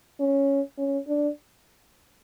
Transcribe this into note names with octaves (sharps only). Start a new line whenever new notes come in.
C#4
C#4
D4